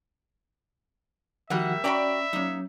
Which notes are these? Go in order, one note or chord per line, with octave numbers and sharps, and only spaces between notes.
D#3 F3 G3 A#3 F#4 E5 F#5
C#4 F#4 D5 G5 A#5 B5
F#3 A#3 C#4 D#4